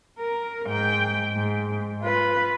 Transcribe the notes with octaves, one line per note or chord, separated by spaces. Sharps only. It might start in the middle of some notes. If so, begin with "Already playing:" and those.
A#4
G#2 G5
G#2
F4 B4